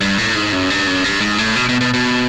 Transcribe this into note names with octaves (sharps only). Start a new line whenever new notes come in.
G2
A2
G#2
F#2
G2
F#2
G2
G#2
A2
B2
B2
B2
B2